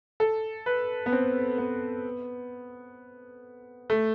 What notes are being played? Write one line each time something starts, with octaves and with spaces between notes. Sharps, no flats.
A4
B4
B3
C4
B3
A3